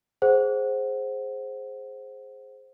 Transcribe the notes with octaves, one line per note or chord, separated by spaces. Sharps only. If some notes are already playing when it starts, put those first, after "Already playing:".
G#4 C5 F#5